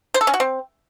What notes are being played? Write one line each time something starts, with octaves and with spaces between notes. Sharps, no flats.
C5
A4
C#4
F#4
C4